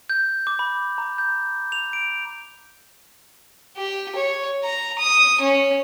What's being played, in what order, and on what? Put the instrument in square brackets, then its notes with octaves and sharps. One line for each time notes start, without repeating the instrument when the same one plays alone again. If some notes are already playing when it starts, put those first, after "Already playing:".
[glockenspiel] G6
D6
B5
A#5
G6
F7
D7
[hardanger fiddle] G4
C#5
A#5
D#6
C#4